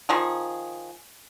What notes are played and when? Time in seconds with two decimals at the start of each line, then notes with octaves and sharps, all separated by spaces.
0.09 D#3 F3 G#4